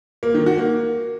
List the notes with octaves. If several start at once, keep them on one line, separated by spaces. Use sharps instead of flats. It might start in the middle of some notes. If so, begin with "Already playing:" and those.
A#3
D#3
F#4
A#3